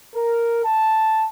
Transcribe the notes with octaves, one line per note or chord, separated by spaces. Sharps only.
A#4
A5